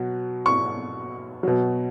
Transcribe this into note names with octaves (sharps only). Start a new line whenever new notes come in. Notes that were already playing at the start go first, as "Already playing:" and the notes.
Already playing: B2 F#3
C#6
B2 F#3